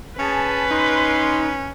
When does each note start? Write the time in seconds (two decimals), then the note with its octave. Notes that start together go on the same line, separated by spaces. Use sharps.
0.19 C#4 G#4 B4 A5
0.71 D#4 C6